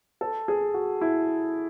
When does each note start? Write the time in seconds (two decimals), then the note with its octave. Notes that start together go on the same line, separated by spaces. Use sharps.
0.21 A4
0.48 G#4
0.74 F#4
1.01 E4